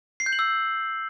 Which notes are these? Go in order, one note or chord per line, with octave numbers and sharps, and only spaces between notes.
C7
G6
F#7
E6